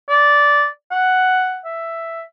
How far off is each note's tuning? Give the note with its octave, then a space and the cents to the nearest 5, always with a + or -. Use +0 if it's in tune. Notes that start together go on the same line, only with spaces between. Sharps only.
D5 -10
F#5 +5
E5 +5